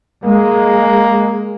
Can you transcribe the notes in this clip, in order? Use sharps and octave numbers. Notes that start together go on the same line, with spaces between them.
G#3 A#3